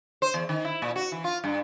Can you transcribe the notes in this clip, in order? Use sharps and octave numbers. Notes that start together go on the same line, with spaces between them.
C5
E2
D#3
E4
A#2
F#4
E3
F4
G2